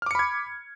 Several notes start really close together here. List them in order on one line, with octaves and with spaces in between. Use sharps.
F6 D6 C#7 B5 G#6